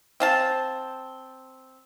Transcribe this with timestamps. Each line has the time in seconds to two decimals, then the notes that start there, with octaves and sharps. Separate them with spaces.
0.20 C4 F5 A5